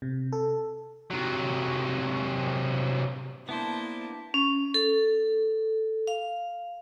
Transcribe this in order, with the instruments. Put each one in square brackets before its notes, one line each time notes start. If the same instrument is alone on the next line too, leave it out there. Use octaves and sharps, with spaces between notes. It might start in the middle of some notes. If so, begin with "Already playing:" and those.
[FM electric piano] C3
A4
[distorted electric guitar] C3 F#3
[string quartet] A#3 E4 A5 [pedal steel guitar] B3 D4 C5
[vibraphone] C#4
A4
F5